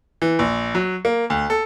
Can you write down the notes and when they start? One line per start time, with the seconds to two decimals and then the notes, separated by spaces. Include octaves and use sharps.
0.22 E3
0.39 A#1
0.75 F#3
1.05 A#3
1.30 D2
1.50 A4